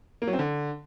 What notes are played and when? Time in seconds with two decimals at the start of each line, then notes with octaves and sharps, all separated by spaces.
0.22 A#3
0.27 F#3
0.33 C4
0.39 D3